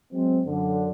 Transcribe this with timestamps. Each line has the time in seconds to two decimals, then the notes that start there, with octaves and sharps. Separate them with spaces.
0.11 F#3 G#3 C4
0.44 F#2 D3